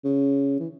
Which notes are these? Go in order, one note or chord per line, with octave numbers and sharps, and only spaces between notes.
C#3
E3